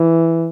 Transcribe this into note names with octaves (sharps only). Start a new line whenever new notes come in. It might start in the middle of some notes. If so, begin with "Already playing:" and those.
Already playing: E3